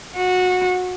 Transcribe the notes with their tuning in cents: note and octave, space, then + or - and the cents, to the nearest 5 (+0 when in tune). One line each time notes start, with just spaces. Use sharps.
F#4 -20